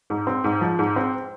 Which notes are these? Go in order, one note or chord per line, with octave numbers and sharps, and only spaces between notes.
G#2
C4
G#2
F3
G#2
C4